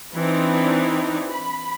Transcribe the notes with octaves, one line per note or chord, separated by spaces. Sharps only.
E3 C4 D4 D#4
B5